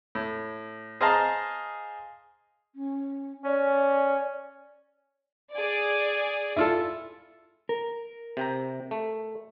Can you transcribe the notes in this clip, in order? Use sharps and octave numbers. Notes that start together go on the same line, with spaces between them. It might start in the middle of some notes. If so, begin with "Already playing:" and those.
A2
G#4 C5 D#5 F5 A5 A#5
C#4
C#4 D5
G#4 D5
E4 F4 A4
A#4
C3 G5 A#5
A3